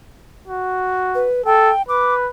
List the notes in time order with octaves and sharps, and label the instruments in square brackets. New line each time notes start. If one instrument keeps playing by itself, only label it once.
[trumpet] F#4
[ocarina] B4
[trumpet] A4 [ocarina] G5
[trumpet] B4 [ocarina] D6